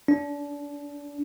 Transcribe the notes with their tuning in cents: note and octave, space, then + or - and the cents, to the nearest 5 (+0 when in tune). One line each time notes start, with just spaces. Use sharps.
D4 -30